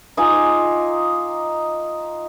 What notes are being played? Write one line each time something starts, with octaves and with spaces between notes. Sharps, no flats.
D#4 F4 G#5 D6